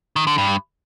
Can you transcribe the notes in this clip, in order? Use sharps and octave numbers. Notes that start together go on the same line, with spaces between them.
D#3
D3
G2